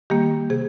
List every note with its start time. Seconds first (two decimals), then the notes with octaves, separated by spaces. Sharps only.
0.10 D#3 G3 A#3 G4
0.50 C3 G#4